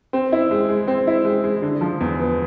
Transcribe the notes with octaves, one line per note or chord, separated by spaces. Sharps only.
C4
E4
G#3
G#3
C4
E4
G#3
G#3
D3
F3
E2
B3